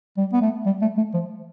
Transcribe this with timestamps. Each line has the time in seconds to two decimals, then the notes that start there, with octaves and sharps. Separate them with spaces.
0.17 G3
0.33 B3
0.42 A3
0.66 G3
0.81 A3
0.97 A3
1.14 F3